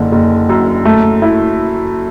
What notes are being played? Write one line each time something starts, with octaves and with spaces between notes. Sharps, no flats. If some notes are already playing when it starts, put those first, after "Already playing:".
Already playing: F#1 D3
F#1
F#2
A3
E4